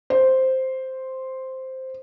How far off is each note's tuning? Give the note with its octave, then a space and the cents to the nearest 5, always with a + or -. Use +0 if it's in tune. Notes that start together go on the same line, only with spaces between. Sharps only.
C5 +0